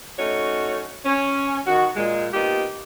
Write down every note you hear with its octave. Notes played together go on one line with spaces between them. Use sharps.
A3 C#4 D#4 F#4 C#5
C#4
D#3 F#4
A#2 G#3
A#3 B3 D#4 F4 G4